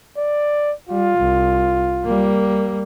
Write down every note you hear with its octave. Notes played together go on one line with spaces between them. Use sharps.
D5
G3 F4
C2
G3 A#3